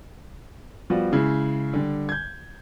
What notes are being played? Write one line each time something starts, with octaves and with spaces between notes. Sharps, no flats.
F3 G3 B3 F4 F#4
C#3 G#3 E4
D3 G3
G6 G#6